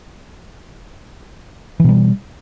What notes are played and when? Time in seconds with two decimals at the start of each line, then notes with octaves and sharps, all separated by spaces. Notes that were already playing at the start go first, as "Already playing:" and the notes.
1.80 E3
1.84 B2
1.89 G3